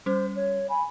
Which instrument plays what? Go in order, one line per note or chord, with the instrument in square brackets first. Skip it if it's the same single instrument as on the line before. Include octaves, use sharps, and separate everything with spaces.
[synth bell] G3 C#4 [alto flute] C5
[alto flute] C#5
[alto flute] G#5 [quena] B5